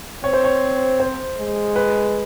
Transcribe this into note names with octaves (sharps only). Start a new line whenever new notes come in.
C4 C#5
C5
C#5
C5
G#3
B4